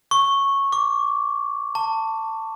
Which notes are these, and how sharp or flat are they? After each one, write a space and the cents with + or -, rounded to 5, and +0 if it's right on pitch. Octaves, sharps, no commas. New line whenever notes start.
C#6 -10
D6 -20
A5 +20